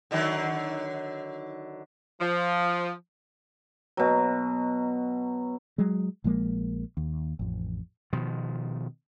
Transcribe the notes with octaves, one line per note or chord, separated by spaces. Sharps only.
D3 D#3 F#3
F3
B2 F#3
F#3 G#3
A#1 F3 G#3 A#3
D#2
A1 F2
B2 D#3 F3